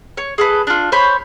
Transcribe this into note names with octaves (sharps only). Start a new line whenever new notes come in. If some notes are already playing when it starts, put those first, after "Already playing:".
C#5
G#4 A4 B4
D4 F4
C5 C#5 B5